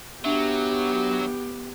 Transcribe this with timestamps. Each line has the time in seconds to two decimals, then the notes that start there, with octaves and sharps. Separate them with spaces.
0.24 F#3 B3 D4 G4 E5